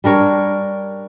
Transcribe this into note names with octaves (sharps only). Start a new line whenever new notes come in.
G3 D4 A#4 C#5